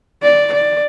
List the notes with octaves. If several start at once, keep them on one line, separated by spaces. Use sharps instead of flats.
D5
D5